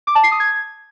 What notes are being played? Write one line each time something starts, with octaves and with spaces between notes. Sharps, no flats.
D6
A5
C7
D#6
G#6